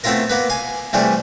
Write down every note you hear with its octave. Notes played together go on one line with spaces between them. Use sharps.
A3 B3 C4 E4 F4 A#4
A#3 B3 B4
F5 G#5
C3 E3 G3 A3 G#4